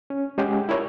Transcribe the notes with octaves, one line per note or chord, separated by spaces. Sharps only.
C#4
G#3 C#4 G4 G#4 F#5
E4 F4 A#4 C#5 D5